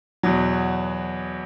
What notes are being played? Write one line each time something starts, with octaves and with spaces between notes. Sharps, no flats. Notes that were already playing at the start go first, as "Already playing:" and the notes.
E2 B2 F#3